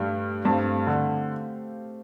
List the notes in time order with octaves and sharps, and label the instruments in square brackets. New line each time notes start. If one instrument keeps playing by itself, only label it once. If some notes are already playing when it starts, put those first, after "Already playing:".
Already playing: [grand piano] G2 G3 [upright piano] A3 D4
[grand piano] G2 G3 [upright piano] A3 C4 G4 C5 F5
[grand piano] D3